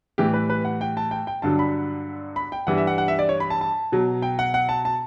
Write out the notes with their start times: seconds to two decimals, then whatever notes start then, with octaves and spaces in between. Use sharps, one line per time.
0.18 A2 E3 G3 G4
0.34 B4
0.50 B4
0.65 F#5
0.81 G5
0.97 A5
1.11 G5
1.27 G5
1.42 G2 D3 F#3 A5
1.59 B5
2.36 B5
2.52 G5
2.67 G2 E3 G3 F#5
2.78 E5
2.87 F#5
2.98 F#5
3.08 E5
3.19 D5
3.29 C#5
3.40 B5
3.50 A5
3.61 A5
3.92 B2 F#3
4.22 G5
4.39 F#5
4.54 F#5
4.69 A5
4.85 A5